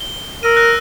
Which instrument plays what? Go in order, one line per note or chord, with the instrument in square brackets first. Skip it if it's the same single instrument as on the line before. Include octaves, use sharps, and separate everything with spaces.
[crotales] G7
[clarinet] A#4 [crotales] E6 D#7
[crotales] E6 F#6 A#6